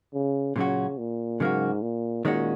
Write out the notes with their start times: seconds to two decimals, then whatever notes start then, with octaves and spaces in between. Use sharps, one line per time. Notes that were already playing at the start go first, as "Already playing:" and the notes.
0.14 C#3
0.56 A#2 C#3 F#3 C#4 F#4
0.98 A#2
1.40 G#2 C#3 F#3 A#3 F#4
1.82 A#2
2.25 A#2 D#3 G#3 C#4 F#4